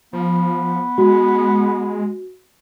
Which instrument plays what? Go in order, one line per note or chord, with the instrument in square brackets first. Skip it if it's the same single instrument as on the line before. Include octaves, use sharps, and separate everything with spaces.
[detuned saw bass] F3 [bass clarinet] B3
[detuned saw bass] G#3 [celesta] F#4